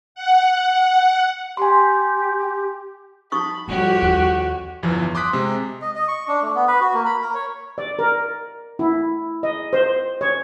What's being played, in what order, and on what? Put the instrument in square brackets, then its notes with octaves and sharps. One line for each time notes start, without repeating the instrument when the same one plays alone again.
[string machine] F#5
[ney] G4 [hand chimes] G#5 C6
[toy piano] D#4 C#6 D#6 [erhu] B5
[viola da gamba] F2 G4 C#5 [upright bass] G3 [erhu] F#4
[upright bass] D#2
[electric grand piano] G1 E2 E3 F3
C6 D6 D#6 F#6 B6
C3 G#3
[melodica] D#5
D#5
C#6
D4
A3
B3
B4
F#4
A#3
B5
A#4
C#5
[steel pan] D5
A#4
E4
D#5
C5
C#5